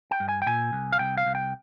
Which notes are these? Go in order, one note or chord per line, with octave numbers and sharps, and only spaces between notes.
G5
G2
G#5
G5
A#2 G#5
C2
F5
C2 G5
F5
C2
G5